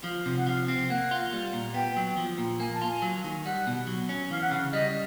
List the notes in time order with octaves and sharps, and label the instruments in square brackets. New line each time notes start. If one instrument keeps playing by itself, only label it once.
[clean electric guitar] F3 [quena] F5
[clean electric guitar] C3
[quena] F#5
[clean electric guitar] F3 [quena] F5
[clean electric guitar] C4
[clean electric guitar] A#3 [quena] F#5
[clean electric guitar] F4
G3
A#2
[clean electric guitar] B3 [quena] G5
[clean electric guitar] F#3
F3
A#2
[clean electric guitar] A#3 [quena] G#5
[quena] A5
[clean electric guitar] F4
[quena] G#5
[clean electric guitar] F#3
D#3
[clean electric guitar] G3 [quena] F#5
[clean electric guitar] B2
F#3
C#4
[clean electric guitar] E3 [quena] F5
[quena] F#5
[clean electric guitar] C#3 [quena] F5
[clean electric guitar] G3 [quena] D#5